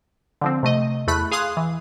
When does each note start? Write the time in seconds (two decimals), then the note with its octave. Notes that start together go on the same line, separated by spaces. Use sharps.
0.41 D3 F3 C4
0.63 C3 A3 D#5
1.07 E2 A3 B5 F#6
1.31 G#4 F5 C6 D#6 F#6
1.57 E3